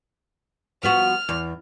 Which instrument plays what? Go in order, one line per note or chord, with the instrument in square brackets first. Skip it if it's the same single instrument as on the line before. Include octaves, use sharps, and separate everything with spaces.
[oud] F3 B3 F#4 [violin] F6
[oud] E2